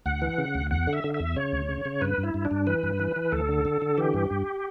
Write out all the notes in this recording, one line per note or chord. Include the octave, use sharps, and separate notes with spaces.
D2 F#5
E3
C#3
D2
E2 F#5
D3
E5
D3
E5
E2
C#3 C#5
D2
C#3
C#3
G2 B4
G2
E4
G2
D4
G2
E3 B4
G2
E3
E3
D2 A4
D3
D3
D3
E3 G4
G2
G2